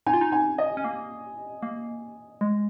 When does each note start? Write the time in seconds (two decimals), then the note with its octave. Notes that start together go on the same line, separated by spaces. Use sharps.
0.06 D#4 G#5
0.13 F4
0.21 D#4
0.32 G#5
0.58 D#5
0.77 C#4
0.84 A#3
1.63 A#3
2.41 G#3